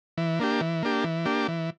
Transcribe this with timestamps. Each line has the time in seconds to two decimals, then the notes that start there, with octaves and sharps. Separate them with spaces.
0.18 E3
0.40 A#3 D4 G4
0.61 E3
0.83 A#3 D4 G4
1.04 E3
1.25 A#3 D4 G4
1.48 E3